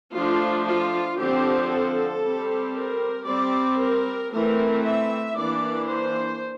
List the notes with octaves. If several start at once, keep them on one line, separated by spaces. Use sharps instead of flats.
F3 A3 D4 F4
F4
D3 F3 C4 G4
A4
G3 C4
A#4
G3 C4 D5
A#4
E3 A3 C4 A#4
E5
E3 A#3 D4 D5
C5